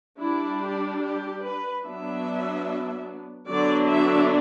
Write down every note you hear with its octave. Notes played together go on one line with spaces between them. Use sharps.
G3 D4 E4
G4
G4
B4
F#3 B3 D4 E5
D3 F#3 B3 D4 D5
E5